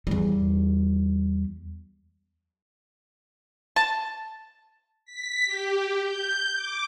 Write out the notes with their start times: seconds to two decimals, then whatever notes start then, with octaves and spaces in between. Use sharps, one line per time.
0.07 E2 G3
3.76 A5
5.05 B6
5.46 G4
6.03 G6
6.55 D6